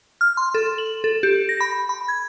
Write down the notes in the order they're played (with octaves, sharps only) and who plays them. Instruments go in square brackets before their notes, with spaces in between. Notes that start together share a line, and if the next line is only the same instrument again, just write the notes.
[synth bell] F6
C6
A4
F#7
A4
G4
A#6
B5
B5
G#6